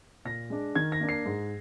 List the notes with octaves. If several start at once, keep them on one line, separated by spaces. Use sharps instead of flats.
A#2 A#6
G#3 D4
D#3 G#6
A#6
A#3 D4
C7
G#2